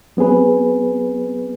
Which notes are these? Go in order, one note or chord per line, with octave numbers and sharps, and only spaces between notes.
F#3 B3 C4 G#4 B4